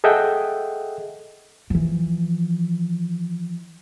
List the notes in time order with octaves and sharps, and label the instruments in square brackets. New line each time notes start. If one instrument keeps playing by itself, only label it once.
[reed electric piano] G#4 A4 D#5 E5 F#5 G5
[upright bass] E3 F3